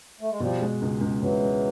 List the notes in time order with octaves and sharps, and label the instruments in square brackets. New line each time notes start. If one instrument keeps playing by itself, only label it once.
[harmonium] A3
G#3
[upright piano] B2 [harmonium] F3 G3
[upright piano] G#3
C#2
C#2
[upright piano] B2 [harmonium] E3 F#3
[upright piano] G#3